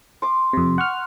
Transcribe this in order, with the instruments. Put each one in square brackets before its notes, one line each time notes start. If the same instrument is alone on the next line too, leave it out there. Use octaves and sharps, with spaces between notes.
[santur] C6 D6
[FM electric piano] F2 C3
F#5 C#6 F6